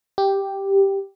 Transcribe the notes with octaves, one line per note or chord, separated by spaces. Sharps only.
G4